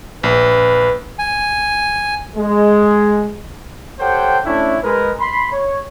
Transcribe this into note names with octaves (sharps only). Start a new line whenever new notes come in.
A#1 B4
G#5
G#3
G4 A4 C5 C#5 F#5 G5
A3 C#4 D4 E4 C#5 E5
G#3 A#4 B4
B5 C6
C#5